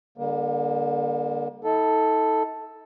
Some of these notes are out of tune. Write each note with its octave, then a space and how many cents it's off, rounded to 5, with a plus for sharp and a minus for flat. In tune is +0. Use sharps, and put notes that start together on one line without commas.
D3 -10 G3 +45 A#3 +30
D#4 +45 A4 +0